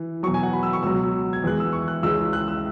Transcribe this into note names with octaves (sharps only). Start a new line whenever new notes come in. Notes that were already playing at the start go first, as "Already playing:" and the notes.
Already playing: E3
E2 B2 F#3 C#6
G#5
F#5
B5
E6
C#6
C#2 B2 F#3 E6
G#6
E2 E3 G#3 F#6
E6
C#6
F#6
C#2 C#3 E3 G#3 E6
F#6
E6